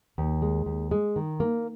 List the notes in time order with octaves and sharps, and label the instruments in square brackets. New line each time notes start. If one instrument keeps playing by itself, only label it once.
[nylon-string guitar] D#2
G#3
D#2
G#3
D#3
A#3